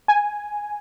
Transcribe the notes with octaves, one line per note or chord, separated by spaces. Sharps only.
G#5